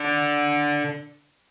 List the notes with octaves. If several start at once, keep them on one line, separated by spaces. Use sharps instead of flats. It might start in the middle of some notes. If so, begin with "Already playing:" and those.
Already playing: D3